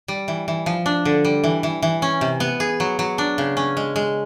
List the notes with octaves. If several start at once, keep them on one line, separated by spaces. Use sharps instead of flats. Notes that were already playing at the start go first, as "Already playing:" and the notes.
G3
E3
E3
F3
D4
D3
G3
E3
E3
E3
C#4
C3
B3
G#4
F#3
F#3
D4
C#3
C#4
G#3
G#3